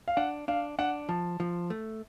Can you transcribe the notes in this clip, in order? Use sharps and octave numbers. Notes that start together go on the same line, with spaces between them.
F5
D4 F#5
D4 F5
D4 F#5
F3 A5
F3
A3